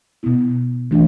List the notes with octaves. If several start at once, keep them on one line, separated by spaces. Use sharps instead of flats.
B2 B3 E4
E3 A3 D4 F#4